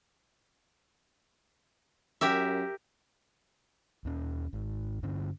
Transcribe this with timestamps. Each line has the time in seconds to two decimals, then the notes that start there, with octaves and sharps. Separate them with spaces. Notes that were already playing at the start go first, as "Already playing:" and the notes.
2.21 F#2 G4 A#4 E5
4.05 D#2 C#4
4.53 G#1
5.03 G2 D3 C#4